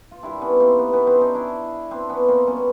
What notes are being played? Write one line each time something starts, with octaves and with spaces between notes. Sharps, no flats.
F4
C3 D#3 G3 D4 E4
B3 C#4
A#3 C4
B3
B3 C#4
C4 D4
C#4 D#4
D4 E4
C4 D4
B3 C#4
A#3 C4
B2 G3 B3 C#4